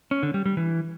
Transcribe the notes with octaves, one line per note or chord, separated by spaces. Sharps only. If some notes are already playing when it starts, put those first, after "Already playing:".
C#4
D3
G3
G3
E3